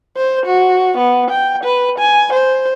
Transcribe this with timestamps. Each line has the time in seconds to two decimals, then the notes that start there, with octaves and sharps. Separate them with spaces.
0.17 C5
0.46 F#4
0.98 B3
1.31 G5
1.64 B4
1.99 G#5
2.34 C5